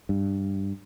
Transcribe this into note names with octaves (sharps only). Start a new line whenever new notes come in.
G2